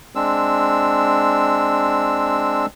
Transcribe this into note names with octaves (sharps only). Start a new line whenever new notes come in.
G#3 C4 D4 E6